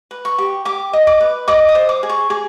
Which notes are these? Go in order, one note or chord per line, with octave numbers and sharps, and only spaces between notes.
B4
C#6
G4
G4 D6
D#5
D6
B4
D#5 D6
D#6
C5
D6
G#4
C#6
G#4 D6